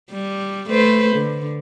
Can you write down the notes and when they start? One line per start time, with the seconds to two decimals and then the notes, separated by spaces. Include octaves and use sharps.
0.11 G3
0.70 A3 B4 C5
1.16 D3